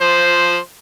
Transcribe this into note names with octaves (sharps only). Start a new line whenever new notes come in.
F3 C5